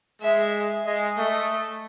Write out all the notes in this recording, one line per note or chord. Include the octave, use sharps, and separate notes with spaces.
G#3 E5
G#3
A3 D#5